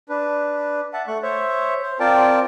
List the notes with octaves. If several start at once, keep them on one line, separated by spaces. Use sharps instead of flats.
D4 B4
E5 F#5 A5
A3 C#6 F#6
C5 C#5 E5
C5
C4 F4 A#4 D5 G5 A5